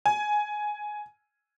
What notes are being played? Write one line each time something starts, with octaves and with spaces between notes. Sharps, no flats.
G#5